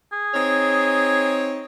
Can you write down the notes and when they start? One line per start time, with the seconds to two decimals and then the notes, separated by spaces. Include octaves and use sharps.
0.12 G#4
0.34 C4 D#4 C#5